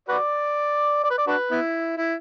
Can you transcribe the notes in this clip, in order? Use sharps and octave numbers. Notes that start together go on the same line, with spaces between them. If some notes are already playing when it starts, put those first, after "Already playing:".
F#4 B4 D5
D5
B4
D5
D4 F#4 B4
B3 E4
E4